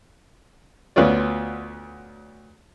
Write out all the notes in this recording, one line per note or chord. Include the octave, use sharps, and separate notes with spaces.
D2 B3 C#4 F4 D5